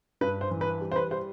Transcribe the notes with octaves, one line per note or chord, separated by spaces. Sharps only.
G2 B4
C5
E3
B4
G3
C5
B4
G3 C5